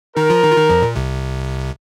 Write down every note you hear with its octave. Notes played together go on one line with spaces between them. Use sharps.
D#3 D#4 A#4
F3 F4
D#3 D#4
F4
D#3 D#4
F2 F3
A#2
C2 C3